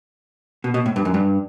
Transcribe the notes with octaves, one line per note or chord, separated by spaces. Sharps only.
B2
B2
A2
G2
F#2
G2